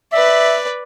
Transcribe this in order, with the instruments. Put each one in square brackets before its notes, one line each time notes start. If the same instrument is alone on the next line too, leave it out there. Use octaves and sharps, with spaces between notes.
[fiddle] B4 D5 [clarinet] E5